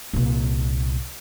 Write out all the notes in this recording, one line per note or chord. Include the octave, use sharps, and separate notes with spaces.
C2 A#2